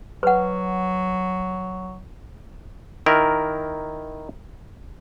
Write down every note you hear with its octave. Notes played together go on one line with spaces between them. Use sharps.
F#3 B4 F#5
D#3 E4 A#4